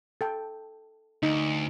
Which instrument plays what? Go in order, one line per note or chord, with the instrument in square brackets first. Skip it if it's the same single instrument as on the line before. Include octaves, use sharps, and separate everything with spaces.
[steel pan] A4 G5
[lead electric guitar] D2 [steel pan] D#4